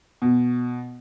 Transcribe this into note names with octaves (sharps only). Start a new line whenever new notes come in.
B2